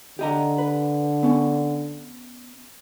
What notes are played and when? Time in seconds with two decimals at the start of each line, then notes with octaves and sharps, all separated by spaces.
0.19 D3 G4 D#5 A#5
0.58 B4
1.23 B3 C#4